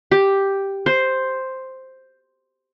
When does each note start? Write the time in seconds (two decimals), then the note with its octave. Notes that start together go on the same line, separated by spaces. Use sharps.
0.11 G4
0.86 C5